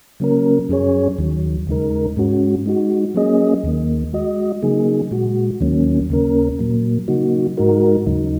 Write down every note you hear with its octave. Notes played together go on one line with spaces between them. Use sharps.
C#3 F#3 A#3 C#4 A#4
F#2 F#3 C#4 G#4 C#5
D#2 D#3 F#3
D#2 C#3 G#3 D#4 A#4
G#2 G#3 C#4 F#4
G#3 D#4 F#4
F#3 A#3 C#4 G#4 D#5
D#2 D#3 A#3
G#3 F#4 D#5
C#3 F#3 A#3 D#4 G#4
A#2 G#3 F#4
D#2 D#3 F#3 A#3 C#4
D#2 C#3 A#3 C#4 A#4
A#2 F#3 A#3
C#3 F#3 A#3 D#4 F#4
G#2 G#3 D#4 F#4 A#4
D#2 C#3 F#3 D#4